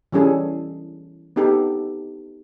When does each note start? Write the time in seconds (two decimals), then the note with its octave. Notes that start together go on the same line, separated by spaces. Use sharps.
0.12 E3 G3 C#4 G#4 A4
1.36 B3 D#4 G4 A4